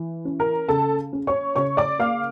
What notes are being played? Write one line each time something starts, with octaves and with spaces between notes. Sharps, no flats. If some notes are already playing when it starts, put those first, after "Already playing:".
Already playing: E3
C#4
A#4 A#5
C#3 A4 A5
C#4
C#5 C#6
C#3 C#5 C#6
D5 D6
A#3 F5 F6